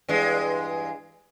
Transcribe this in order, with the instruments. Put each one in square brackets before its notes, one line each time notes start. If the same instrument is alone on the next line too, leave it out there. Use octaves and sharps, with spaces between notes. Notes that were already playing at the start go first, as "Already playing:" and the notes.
[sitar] E2 G2 G#3